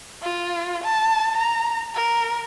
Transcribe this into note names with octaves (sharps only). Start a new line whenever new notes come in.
F4
A5
A#5
A#4